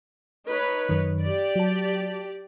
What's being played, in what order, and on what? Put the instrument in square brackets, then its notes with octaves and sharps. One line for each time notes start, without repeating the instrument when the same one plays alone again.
[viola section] D#4 B4 C#5
[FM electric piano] F#2 D#3
[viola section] G4 D5
[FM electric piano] F#3 A5